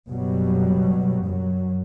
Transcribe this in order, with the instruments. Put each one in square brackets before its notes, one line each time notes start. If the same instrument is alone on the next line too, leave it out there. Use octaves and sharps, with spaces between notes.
[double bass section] F#1 B2 F#3 G3
F#2 F#3